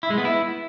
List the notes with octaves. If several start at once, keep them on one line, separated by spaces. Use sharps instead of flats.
E4
G#3
B3
E4